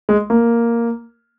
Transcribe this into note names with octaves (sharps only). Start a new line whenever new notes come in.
G#3
A#3